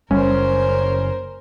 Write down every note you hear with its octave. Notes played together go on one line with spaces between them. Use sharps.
F#1 G3 C#4 A#4 C5